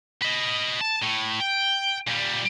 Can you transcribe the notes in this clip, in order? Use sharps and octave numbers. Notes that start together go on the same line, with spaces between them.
B4 D#5
A5
A2
G5
A#2 G3